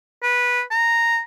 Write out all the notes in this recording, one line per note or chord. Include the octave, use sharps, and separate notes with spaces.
B4
A#5